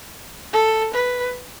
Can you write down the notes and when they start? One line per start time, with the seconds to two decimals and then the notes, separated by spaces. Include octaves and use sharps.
0.53 A4
0.94 B4